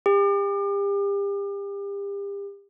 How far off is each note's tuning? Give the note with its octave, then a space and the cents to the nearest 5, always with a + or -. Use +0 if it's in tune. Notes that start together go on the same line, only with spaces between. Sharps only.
G4 +35